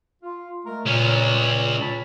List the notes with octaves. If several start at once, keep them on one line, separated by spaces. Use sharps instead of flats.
F4
G#3 A3 A#4
C#2 A#2 C#4
C#5 A5 B5